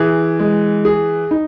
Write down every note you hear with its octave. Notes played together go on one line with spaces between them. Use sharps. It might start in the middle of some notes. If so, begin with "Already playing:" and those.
Already playing: E3 G#4
G#3
G#4
D#4